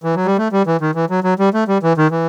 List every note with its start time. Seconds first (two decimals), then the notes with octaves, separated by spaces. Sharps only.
0.04 E3
0.16 F#3
0.26 G3
0.38 A3
0.52 G3
0.67 E3
0.81 D#3
0.95 E3
1.10 F#3
1.24 F#3
1.39 G3
1.54 A3
1.68 G3
1.83 E3
1.97 D#3
2.11 E3